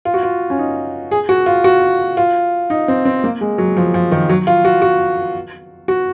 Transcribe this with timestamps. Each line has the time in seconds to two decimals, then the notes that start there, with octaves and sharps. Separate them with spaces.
0.05 F4
0.14 F#4
0.23 F4
0.50 C#4
0.59 D#4
1.11 G#4
1.29 F#4
1.46 F4
1.64 F#4
2.17 F4
2.70 D#4
2.88 C4
3.05 C4
3.24 A#3
3.41 G#3
3.58 F#3
3.77 F3
3.94 F3
4.12 D#3
4.29 F#3
4.47 F4
4.65 F#4
4.82 F#4
5.88 F#4